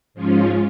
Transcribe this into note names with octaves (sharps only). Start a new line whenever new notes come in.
G#2 F3 G#3 C#4 F4